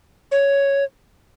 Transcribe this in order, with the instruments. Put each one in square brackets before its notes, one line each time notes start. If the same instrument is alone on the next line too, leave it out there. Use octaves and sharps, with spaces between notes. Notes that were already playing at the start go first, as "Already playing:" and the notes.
[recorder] C#5